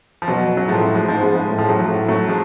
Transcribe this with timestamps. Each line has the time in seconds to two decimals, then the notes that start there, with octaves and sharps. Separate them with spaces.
0.22 F3
0.27 B2 F#3
0.57 F#3
0.68 A2 F3 G#3
0.81 F#3
0.94 F3 G#3
1.08 G#2 F3 G#3
1.22 G#3 B3
1.35 F3 G#3
1.48 A2
1.58 F3 G#3
1.69 F#3
1.79 F3
1.88 A2 F#3
2.08 F#3 A3
2.28 F3 G#3